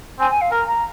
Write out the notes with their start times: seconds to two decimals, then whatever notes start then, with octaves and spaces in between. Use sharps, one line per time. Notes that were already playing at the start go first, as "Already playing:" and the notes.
0.20 C4 G#5
0.30 G#5
0.41 F5
0.51 A#4 A#5
0.68 A#5